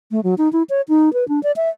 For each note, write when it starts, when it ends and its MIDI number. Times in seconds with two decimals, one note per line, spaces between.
0.11 0.21 57
0.24 0.35 54
0.38 0.51 63
0.53 0.63 64
0.69 0.81 73
0.89 1.13 63
1.13 1.27 71
1.28 1.42 62
1.43 1.52 74
1.56 1.69 76